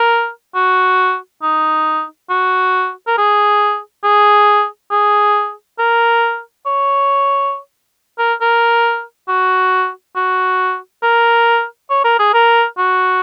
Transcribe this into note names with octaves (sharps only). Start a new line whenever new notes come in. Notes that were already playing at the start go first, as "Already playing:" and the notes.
Already playing: A#4
F#4
D#4
F#4
A#4
G#4
G#4
G#4
A#4
C#5
A#4
A#4
F#4
F#4
A#4
C#5
A#4
G#4
A#4
F#4